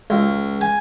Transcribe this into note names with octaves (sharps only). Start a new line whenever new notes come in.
C#2
G#5